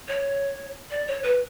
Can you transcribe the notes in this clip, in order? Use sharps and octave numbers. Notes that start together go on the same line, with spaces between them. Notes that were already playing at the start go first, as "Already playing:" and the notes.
C#5
D5
C#5
B4